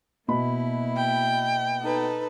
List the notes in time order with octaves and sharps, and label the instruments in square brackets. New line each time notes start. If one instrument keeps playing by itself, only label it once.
[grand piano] B2 B5 [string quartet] A#3 E4
[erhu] G5
[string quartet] D#4 A4 B4